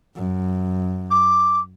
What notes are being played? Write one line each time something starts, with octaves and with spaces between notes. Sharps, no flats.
F#2
D6